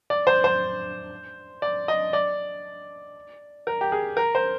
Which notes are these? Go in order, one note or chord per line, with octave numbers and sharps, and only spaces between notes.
D5
C5
C5
D5
D#5
D5
A#4
G4
G#4
A#4
C5